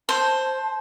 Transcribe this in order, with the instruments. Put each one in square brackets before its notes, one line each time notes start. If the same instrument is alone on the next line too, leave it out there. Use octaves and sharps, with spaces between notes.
[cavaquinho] C5 [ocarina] A5